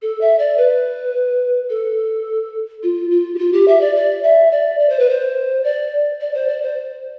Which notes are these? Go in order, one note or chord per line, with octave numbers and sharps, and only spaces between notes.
A4
E5
D5
B4
A4
F4
F4
G4
F4
G4
E5
D5
D5
E5
D5
D5
C5
B4
C5
D5
D5
C5
D5
C5